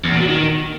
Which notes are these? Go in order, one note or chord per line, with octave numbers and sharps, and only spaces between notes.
E2
A#2
F#3
D#3